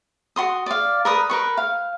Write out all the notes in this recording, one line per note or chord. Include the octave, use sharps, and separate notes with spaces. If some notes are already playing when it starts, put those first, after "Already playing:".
F#4 C6 D#6
D5 F5
A#4 B4 D#6
A#4 B4 C#6
F5